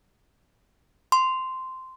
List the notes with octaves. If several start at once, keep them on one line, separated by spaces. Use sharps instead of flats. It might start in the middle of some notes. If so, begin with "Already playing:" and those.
C6